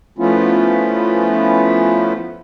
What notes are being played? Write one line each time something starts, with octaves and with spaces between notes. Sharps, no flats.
F3 A3 B3 C#4 E4 F4